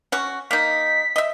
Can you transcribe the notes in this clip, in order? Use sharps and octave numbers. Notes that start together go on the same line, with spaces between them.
C#4 F#4
A#3 D#4 B6
D#5 E5